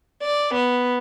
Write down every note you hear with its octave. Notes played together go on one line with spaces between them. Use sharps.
D5
B3